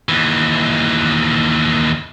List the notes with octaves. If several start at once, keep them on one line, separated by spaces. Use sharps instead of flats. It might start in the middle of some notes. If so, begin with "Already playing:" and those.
D#2 E3